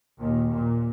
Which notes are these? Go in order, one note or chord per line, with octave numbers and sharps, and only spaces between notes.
D#2 A#2
A#2